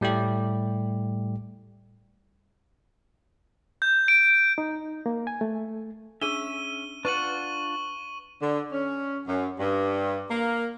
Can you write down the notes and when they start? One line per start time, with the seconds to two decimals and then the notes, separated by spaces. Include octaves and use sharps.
0.01 A2 G3 A3 G4
3.82 G6
4.08 D7
4.58 D#4
5.06 A#3
5.27 G#5
5.41 A3
6.22 C#4 D4 G#4 E5 E6 D#7 G7
7.05 D4 F4 B4 F#5 C#6 D#7 F#7
8.42 D3
8.72 C#4
9.28 F#2
9.58 G2
10.30 A#3